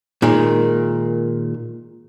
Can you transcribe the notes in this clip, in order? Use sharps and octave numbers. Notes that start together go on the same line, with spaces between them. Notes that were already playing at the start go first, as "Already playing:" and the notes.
A#2 D#3 G#3